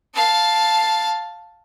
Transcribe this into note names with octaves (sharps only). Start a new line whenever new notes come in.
F5 A5